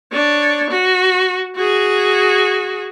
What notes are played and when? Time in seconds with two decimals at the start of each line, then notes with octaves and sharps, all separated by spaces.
0.12 D4 C#5
0.71 F#4
1.56 F#4 G#4